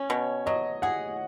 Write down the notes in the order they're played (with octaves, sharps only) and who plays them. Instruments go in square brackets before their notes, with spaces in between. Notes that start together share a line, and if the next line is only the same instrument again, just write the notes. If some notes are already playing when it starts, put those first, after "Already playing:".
Already playing: [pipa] C#4 [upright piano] C#5
[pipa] B2
[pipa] F#3 [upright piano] D#5
[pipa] G#4 [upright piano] F#5